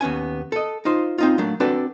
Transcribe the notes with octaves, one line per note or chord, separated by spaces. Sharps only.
D#2 B3 C#4 G#5
A4 D#5
D#4 F4 C5
C4 D#4 F4
F#3 A3 A#3 D4
C4 D4 F#4 A4 B4 D5